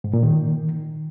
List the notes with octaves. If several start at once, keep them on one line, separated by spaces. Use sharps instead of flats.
G#2
A#2
D#3